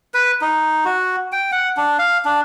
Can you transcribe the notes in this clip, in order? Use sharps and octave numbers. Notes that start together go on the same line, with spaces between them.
B4
D#4
F#4
G5
F#5
D4
F5
D4